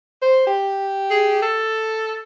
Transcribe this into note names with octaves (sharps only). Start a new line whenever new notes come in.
C5
G4
G#4
A4